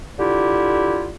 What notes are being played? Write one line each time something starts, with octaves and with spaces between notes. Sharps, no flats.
D3 E4 F4 G4